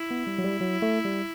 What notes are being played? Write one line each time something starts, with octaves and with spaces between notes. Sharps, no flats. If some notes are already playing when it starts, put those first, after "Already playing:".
Already playing: E4
B3
G3
F#3
G3
F#3
A3
G3